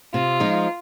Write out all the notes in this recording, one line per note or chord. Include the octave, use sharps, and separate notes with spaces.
C3 F4
F3 G#3 D#4